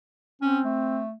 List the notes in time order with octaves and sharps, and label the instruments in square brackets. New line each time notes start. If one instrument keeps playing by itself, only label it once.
[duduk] C4 [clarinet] C#4
[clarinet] A3